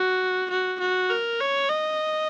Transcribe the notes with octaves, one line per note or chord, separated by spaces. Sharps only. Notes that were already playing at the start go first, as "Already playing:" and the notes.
Already playing: F#4
F#4
F#4
A#4
C#5
D#5